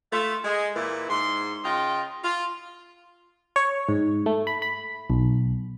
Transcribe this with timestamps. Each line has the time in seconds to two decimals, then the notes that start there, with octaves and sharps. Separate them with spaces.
0.13 A3 F4 E5
0.45 G#3
0.76 A#2 E3 E4
1.09 G#2 C6
1.64 C#3 F4 D#5 G5
2.24 F4
3.56 C#5
3.89 G#2
4.26 A3
4.47 B5
4.62 B5
5.10 B1